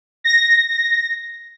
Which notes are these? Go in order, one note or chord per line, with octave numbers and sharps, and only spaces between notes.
A#6